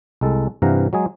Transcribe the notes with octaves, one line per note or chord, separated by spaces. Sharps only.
C2 G#3 A4
G2 C3 E3 F5 F#5 A#5
F#3 G#3 G#4